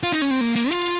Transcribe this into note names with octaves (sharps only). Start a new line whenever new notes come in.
F4
D#4
C#4
C4
A#3
A#3
F4